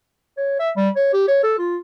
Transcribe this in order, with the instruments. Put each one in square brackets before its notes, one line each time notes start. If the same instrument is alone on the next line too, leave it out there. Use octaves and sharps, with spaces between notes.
[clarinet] C#5
E5
G3
C#5
G4
C#5
A4
F4